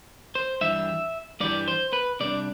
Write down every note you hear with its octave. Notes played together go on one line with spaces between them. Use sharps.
C5
G2 E3 G3 E5
G2 E3 G3 D5
C5
B4
C3 G3 D4 D5